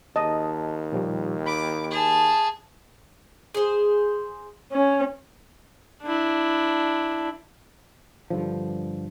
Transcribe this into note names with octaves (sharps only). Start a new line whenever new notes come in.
D#2 D#5 A5
A#2 F3 G3
B5 D6
G#4 A5
G#4 C5
C#4
D4 E4
G2 D3 F3